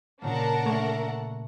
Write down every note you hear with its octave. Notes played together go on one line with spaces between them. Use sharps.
A#2 C#3 A#3 D4 A#4 F#5
A3 C#6 G#6